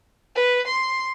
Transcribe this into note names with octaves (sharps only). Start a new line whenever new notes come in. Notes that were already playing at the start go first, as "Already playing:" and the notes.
B4
C6